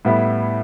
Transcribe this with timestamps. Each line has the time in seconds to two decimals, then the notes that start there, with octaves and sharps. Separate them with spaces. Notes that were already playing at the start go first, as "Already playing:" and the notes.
0.05 A2 G3 B3 E4